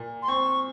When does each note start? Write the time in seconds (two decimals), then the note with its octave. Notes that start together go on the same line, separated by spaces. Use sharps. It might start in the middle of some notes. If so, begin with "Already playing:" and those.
Already playing: A#2
0.22 C6
0.28 C4 C#6